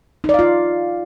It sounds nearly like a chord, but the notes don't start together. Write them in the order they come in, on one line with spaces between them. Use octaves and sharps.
D#4 D5 F5 F4